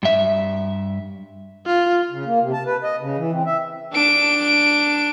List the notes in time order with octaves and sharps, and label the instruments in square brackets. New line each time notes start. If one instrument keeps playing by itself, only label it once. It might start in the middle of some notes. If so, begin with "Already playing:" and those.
[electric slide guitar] G2 E5
[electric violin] F4
[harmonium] C#3
A#3
C3
A5
B4
D#5
C#3
E3
C4
E5
[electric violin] D4 D7